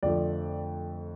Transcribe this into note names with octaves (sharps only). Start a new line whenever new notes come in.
F2 D3 F3 A3 D5